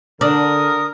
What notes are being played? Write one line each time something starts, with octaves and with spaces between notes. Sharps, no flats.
D3 D4 A#4 D#6